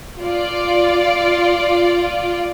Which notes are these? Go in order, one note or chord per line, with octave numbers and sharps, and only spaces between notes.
F4 D5